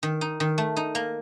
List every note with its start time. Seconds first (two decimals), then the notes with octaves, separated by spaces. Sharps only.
0.03 D#3
0.21 D#4
0.40 D#3
0.58 A3
0.76 D#4
0.95 A#3